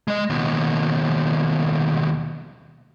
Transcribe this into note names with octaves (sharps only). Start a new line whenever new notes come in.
G#3 D#5
D#2 B2